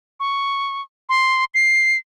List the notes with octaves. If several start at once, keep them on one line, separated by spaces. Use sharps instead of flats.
C#6
C6
C7